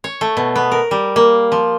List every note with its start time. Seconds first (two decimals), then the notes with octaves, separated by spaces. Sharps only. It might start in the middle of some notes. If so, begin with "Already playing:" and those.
0.04 C#5
0.21 A3
0.37 B2
0.56 B3
0.72 A#4
0.91 G3
1.16 A#3
1.52 F3